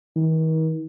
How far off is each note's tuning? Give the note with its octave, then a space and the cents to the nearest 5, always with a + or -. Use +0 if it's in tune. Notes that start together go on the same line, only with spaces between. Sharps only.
D#3 +45